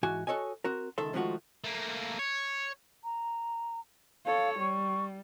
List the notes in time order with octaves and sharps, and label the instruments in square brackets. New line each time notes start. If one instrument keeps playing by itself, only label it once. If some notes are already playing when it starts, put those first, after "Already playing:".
[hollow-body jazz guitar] G#2 E3 F#4 G#5
F#4 A4 C#5 D#5 G#5
C4 F#4 A#4
C#2 D#3 A4 E5 C6
D#3 F3 G#3 A3 F4 F#4
[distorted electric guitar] A3 A#3
C#5
[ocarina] A#5
[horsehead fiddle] A4 C#5 [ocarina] F5
[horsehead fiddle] G3 [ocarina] C#6